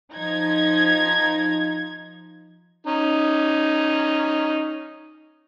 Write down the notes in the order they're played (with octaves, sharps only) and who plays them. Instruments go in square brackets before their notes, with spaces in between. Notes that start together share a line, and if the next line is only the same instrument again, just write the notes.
[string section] F3 D#4 G#6
[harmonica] C#4 D#4